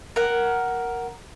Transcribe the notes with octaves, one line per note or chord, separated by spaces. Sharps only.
A#4 F#5